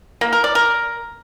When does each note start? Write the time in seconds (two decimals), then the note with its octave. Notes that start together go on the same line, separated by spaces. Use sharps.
0.21 A#3
0.33 A#4
0.44 D5
0.55 A#4